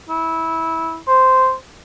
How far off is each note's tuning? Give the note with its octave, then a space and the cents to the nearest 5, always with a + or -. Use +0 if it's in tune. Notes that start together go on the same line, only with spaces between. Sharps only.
E4 -20
C5 -10